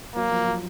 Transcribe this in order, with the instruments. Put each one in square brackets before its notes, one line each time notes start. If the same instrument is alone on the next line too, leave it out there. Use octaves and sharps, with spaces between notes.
[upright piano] F#3 [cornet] A#3
[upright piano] F3
F#3